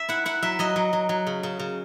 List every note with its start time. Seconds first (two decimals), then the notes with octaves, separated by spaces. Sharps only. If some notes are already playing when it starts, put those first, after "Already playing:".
Already playing: E5
0.09 E4 F#5
0.25 E4 F#5
0.42 F#3 E5
0.59 F#3 D#5
0.76 F#3
0.93 F#3
1.09 F#3
1.27 C#3
1.43 C#3
1.59 C#3